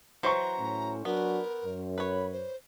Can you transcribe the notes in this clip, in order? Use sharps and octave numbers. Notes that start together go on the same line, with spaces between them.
E3 F#3 C5 A#5 C#6
A2 C#4
F#3 B3 D4 F#4 A#4
F#2
B4 C#5 B5
C5